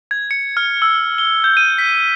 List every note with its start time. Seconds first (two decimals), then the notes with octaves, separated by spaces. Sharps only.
0.11 G#6
0.31 C#7
0.57 F6
0.82 E6
1.18 G7
1.44 G6
1.57 D#7
1.78 B6